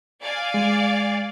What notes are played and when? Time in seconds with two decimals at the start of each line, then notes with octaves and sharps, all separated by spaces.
0.23 D5 F5 G#5
0.54 G#3